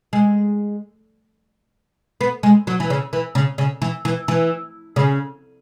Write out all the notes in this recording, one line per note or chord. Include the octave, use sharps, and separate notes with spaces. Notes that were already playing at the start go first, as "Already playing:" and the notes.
G#3
B3
G#3
F#3
E3
C#3
E3
C#3
C#3
E3
E3
E3
C#3